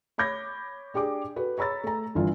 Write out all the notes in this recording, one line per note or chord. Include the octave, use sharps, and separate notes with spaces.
C#5 B5 D6 G6 G#6 A#6
D4 G4 G#4 D6
F#4 A4 B4
C#5 A#5 B5 E6 A6
A3 A#5
G1 D3 E3 F4